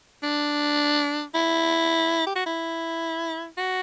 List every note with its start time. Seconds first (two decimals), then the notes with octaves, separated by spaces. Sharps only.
0.23 D4
1.34 E4
2.26 G4
2.36 F#4
2.46 E4
3.58 F#4